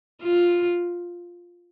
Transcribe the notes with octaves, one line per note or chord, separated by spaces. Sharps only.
F4